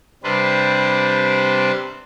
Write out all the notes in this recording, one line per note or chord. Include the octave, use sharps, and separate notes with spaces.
C3 G3 D4 B4 C5